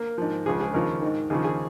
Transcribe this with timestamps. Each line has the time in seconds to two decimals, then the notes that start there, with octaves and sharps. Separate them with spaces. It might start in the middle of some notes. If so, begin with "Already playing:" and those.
Already playing: A#3
0.18 G#2 F3
0.46 C#2 C#3 F3 G#4
0.61 G#4
0.74 D#2 C#3 F3 A#4
1.02 G#2 D#3
1.30 D#2 C#3 F3 G#4
1.44 G#4